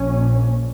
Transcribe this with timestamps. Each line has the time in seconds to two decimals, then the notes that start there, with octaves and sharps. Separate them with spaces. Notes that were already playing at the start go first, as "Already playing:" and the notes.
Already playing: A#1 A#2 C#4